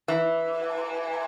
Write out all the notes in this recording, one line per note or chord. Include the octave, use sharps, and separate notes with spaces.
E3